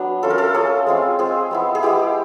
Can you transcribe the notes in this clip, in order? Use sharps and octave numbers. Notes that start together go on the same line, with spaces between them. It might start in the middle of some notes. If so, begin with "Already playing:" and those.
Already playing: F#3 B3 D4
A3 C#4 F4 A4
A#4
A4
A3 C#4 F4 G#4
G#3 C4 F4
G#3 C4 F4 G#4
G#3 B3 E4
G#4
G#3 B3 E4 G4